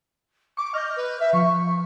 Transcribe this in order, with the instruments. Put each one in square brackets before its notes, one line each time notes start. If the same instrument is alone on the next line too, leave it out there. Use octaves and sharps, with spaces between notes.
[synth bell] C#6 [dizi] D6
[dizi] D#5 [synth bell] F6 G6
[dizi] B4
E5
[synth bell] F3 [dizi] C#6